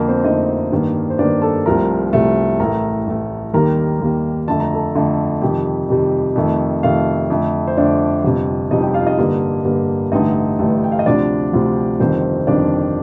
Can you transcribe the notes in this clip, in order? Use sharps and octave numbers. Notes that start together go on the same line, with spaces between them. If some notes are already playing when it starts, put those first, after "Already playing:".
Already playing: F2 D3 A#3 A#4
C4 C5
F2 D3 A3 D#4 D#5
G2 D#3 A#3
C5
G2 D#3 A#3 D4 D5
A4 A5
C2 C3 F3 A3 A#4 A#5
C2 C3 F3 A3
A1 A2 A3 A#4 A#5
A1 A2 A3
D#2 D#3 G3 A#3 A#4 A#5
D#2 D#3 G3 A#3
F2 D3 A3 A5
A#5
A4 A5
F2 D3 A3
F2 C3 D#3 G3 G4 G5
F2 C3 D#3 G3
F2 C3 D#3 A3
F2 C3 D#3 A3 F4 F5
F2 D3 A3
C5
F2 D3 A3 D4 D5
G1 F2 C3
G1 F2 C3 D#4 D#5
G4 G5
F4 F5
D#4 D#5
G2 D3 G3 A#3
G2 D3 G3 A#3
A1 G2 D3 A3 D#4 D#5
A1 G2 D3 A3
G5
F5
D#5
D2 C3 F3 D4 D5
D2 C3 F3
G1 F2 C3 D#3 C4 C5
G1 F2 C3 D#3 D4 D5